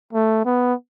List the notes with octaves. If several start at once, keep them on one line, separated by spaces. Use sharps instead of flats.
A3
B3